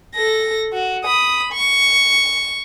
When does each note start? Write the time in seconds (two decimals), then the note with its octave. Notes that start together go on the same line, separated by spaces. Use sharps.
0.15 A4 A#6
0.74 F#4
1.05 B5 D#6
1.53 C#6